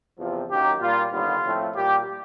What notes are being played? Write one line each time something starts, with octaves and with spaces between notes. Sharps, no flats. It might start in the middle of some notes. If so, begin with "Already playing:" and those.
E2 C3 F3
F#2 D#3 F#3 A#3 G4
A#2 G3 A#3 F4
D#2 D3 G3 B3 F4
A2 F3 A3 C4
A#2 G3 A#3 G4